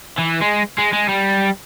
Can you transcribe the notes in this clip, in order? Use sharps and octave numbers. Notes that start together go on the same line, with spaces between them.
E3
G#3
G#3
G#3
G3